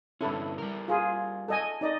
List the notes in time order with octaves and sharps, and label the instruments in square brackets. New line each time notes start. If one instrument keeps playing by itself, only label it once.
[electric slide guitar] G2 D3 C#4 [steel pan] E4 A4
[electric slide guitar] G3 A#4
[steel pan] F4 G#4
A4 D#5 G#5
D#4 D5 D#5